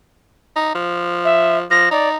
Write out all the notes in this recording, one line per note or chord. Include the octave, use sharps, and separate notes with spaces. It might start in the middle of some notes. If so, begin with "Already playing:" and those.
D#4
F3
E5
F3 A#6
D#4 D5